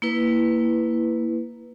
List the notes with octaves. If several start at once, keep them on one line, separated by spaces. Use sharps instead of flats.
A#3 E4 B4